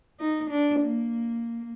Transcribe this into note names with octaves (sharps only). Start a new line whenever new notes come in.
D#4
D4
A#3